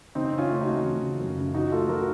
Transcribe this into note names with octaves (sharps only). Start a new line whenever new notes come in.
C#3 C4 D#4
C#3
C#4 F4
A3
D#4 F#4
A3
C#3
C#3
F#2
C#3
F3 D#4 F#4
A3 F4 A4
F3 F#4 A#4